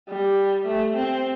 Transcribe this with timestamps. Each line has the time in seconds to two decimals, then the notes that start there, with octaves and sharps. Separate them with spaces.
0.09 G3
0.67 A3
0.96 C4